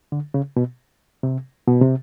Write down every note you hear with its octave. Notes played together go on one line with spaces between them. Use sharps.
D3
C#3
B2
C3
B2
C3